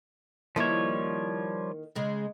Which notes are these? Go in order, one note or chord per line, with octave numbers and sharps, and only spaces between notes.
D#3 F3 G3 A#3 E4 C#5
C#3 G#3